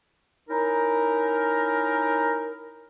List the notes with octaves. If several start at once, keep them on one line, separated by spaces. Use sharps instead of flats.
C#4 D#4 E4 A#4